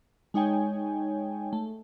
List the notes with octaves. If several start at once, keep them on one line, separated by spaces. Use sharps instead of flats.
G#3 D#4 C#5 G5 G#5
A3